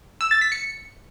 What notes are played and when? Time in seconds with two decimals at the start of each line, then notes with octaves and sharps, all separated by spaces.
0.21 E6
0.31 A6
0.41 B6
0.52 C#7